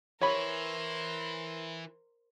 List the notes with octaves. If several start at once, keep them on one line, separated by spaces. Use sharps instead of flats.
E3 E4 A#4 C5 C#5 B5